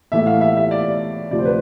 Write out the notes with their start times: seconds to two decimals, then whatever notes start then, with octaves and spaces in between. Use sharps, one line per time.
0.12 A2 E3 A3 E5
0.27 F5
0.41 E5
0.57 E5
0.71 D5
1.31 D2 C3 F3 D5
1.38 C5
1.45 B4